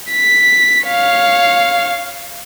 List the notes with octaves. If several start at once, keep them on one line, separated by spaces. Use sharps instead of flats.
B6
C#5 F5